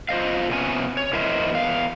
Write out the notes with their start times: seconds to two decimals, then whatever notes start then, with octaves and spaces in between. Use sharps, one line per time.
0.09 F4 C5 D#5 F5
0.50 C3 B3 C#4 G#5
0.97 C#5
1.13 E4 A#4 C5 D#5 E5
1.52 E2 F5